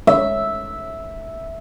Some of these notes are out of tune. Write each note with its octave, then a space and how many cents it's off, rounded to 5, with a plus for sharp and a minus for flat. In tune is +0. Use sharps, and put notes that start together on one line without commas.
E5 -5